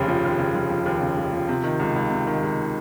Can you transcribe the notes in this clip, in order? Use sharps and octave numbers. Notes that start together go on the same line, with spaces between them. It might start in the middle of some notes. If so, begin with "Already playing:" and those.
Already playing: F1 D#2 C#3
F3
D#2
C#3
F1
F3
D#2
C#3
F1
F3
C3
D#3
C#2
C#2
C3
D#3
C#2